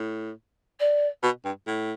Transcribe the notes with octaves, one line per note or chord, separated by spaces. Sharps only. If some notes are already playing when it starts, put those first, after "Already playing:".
Already playing: A2
D5
B2
G2
A2